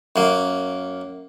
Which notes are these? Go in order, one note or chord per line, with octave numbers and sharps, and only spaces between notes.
F#2 A#3